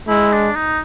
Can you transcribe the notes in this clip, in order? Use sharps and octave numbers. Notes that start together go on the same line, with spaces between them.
G#3 E4
D4
D#4